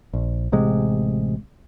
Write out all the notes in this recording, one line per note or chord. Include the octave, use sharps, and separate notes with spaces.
A#1
A1 C3 G#3